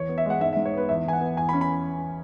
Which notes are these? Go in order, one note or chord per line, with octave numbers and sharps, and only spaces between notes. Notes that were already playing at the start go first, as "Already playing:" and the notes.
Already playing: E2 C#5
B3
E5
G#3 F#5
G#2 E5
E5
G#2
C#5
B3 B4
E2 E5
E2 G#5
F#5
B3
E2 G#5
B5
C#4
B5